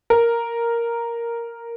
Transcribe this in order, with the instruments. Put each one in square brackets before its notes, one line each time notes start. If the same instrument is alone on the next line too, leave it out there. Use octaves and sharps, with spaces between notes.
[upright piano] A#4